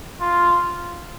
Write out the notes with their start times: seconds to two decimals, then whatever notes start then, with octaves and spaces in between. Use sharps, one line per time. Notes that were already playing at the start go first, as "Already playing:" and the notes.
0.21 F4